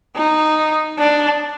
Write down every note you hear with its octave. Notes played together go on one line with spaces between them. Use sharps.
D#4
D4